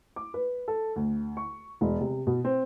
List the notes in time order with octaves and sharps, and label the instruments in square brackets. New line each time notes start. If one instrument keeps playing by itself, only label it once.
[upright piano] D6
B4
A4
D2
C#6
E1
C3
B2
C4